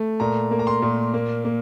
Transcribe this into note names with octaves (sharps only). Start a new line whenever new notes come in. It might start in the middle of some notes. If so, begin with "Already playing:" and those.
Already playing: A3
A#2 A#5
A#3
A#5
C6
A#2
A#3
A#3